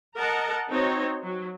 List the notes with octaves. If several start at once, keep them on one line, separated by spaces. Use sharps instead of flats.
A#4 D#5 F#5 A5 A#5
C4 D#4 F#4 C#5
F#3